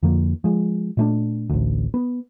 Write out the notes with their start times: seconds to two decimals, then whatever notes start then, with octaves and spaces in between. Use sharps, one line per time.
0.03 F2 D3 F3 A#3
0.44 F3 G#3
0.97 A#2 A3 D4
1.50 A1 D2
1.94 B3